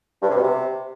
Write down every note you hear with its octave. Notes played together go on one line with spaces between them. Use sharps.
G2
C3
B2
C3